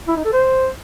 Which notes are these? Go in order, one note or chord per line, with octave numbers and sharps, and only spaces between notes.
E4
D#4
A4
C5